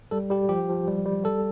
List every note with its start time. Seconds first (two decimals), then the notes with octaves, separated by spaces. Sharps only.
0.11 G3 A4
0.30 G3 G4
0.49 F3 G4
0.69 F3
0.87 G3
1.06 G3
1.24 G3 A4